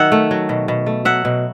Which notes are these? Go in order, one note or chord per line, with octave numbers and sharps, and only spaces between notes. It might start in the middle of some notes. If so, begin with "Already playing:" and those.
Already playing: D#3 F#3 E5 F#5
A3
F#3
B2
B2
A3
F#3 E5 F#5
B2